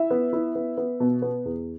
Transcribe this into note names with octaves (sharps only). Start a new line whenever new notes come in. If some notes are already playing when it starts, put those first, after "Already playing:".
Already playing: E4 E5
B3
E4
B3
B3
B2
B3
E2